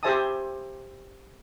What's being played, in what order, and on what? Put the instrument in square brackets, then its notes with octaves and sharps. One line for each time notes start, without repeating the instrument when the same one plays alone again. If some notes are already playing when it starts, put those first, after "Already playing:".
[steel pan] G4 C5 E5 G#5 A5 D#6